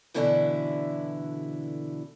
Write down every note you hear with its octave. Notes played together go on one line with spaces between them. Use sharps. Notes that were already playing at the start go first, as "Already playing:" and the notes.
D2 B2 D3 E3 D4 E4